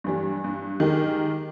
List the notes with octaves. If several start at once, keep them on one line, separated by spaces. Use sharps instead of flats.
G2 E3 G3
G2
D#3 G#3 G4 A#4